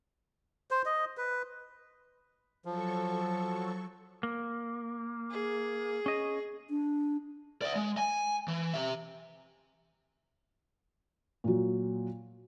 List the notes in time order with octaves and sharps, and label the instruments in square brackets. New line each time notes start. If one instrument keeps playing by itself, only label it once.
[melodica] C5
D#5
B4
[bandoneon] F3 [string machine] F#3 A4 C#6
[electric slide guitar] A#3
[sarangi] G#4
[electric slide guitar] C#4 D#5
[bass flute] D4
[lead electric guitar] D5 E5
G#3
G#5
E3
G4 E5
[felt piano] A#2 F#3